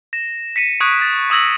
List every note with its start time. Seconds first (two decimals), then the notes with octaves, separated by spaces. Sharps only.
0.13 A#6 E7
0.56 B6 C#7 D#7 E7
0.80 C#6 D#6 F#6 G#6 D7 D#7
1.02 A6
1.30 C#6 D#6 E6 G#6 A#6 F#7